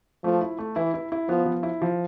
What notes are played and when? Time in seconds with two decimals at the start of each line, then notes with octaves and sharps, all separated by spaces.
0.24 F3 A3
0.41 E4
0.58 A3
0.76 E3 E4
0.94 E4
1.12 E4
1.29 F3 B3
1.46 F3
1.63 E4
1.82 F3